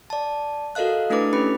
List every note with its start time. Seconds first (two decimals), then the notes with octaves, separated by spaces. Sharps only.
0.10 D5 A5
0.75 F#4 A4 A#4 D#5 F5 F#6
1.10 A3 D4 E4 A4 B4 D6
1.33 C#4 E4 G4 B4 B5